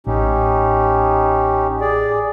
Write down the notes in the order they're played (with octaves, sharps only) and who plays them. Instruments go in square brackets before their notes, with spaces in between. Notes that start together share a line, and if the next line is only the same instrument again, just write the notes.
[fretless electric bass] A1 [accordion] C#4 D#4 G4
[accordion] G#4 D5